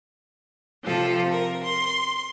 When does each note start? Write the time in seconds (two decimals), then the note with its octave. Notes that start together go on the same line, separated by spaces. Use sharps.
0.85 C3 F3 F4 A4
1.31 A#4
1.63 C6